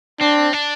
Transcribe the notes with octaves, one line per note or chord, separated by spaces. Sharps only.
C4 D4
D4